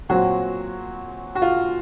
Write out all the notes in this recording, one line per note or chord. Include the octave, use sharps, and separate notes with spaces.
A#2 F#3 C4 F#4
F#4
F4